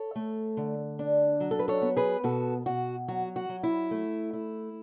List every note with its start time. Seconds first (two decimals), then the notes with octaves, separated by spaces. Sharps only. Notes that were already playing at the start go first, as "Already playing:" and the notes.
Already playing: A4 C#5
0.16 A3
0.57 D3
0.99 D4
1.40 F#3
1.51 A4
1.59 B4
1.68 A4 C#5
1.82 B3
1.97 G#4 B4
2.24 B2 F#4 A4
2.66 B2 F#4
3.08 F#3 F#4
3.36 F#4
3.49 F#3
3.63 E4
3.91 A3
4.33 E4